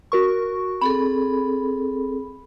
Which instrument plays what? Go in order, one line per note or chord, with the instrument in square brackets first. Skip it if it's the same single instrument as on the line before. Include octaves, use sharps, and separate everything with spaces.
[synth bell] F#4 A#4 C#6
[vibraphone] C4 G#4 A4 [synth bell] B5